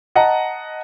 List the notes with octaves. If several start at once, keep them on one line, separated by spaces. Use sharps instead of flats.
D#5 F#5 A5 A#5